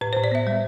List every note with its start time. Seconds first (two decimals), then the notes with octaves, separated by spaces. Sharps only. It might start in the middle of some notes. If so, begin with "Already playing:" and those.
0.01 A2 B4
0.13 A2 C5
0.24 D5
0.32 B3 E5
0.47 G3